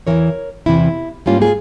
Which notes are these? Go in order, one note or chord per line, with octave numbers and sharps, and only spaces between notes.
E2 C3 E3 A#4 C#5
E2 C3 E3 E4
G#2 G3 A#3 C#4 F4
F4 G#4